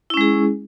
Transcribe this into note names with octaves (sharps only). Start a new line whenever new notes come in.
G#3 C#4 E4 G#4